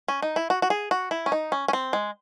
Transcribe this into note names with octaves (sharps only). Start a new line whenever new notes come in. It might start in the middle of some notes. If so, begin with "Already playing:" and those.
C#4
D#4
E4
F#4
F#4
G#4
F#4
E4
C#4
D#4
C#4
C#4
C4
G#3